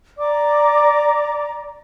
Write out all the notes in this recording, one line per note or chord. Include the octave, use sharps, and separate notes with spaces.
D5 A#5 D6